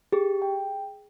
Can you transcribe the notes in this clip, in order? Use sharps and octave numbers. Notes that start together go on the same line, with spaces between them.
G4 G#4
G5